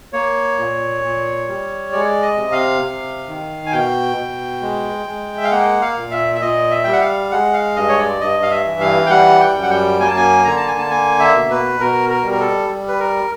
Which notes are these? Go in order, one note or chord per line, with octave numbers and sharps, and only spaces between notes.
A#3 C#5
A#2
A#2
G3
G#3 D5
D#5
C3
F5
C3
D#3
G#5
B2 G5
B2
G#3
G#3
E5
F5
A#3 F#5
F5
A#2
E5
E5
A#2 D#5
E5
G3 G5
F#5
F5
G#3 F#5
F5
G2 D#5
C#5
D5
G2 D#5
F5
E5
E3
F5
G5
G3 F#5
G5
F#2
F#5
G5
A#3 G#5
A5
G#5
D3 A#5
A5
G#5
A5
A#3 G#5
E5
B2
B4
B2 A#4
A#4
G3
A#4
A4
G3
B4
A#4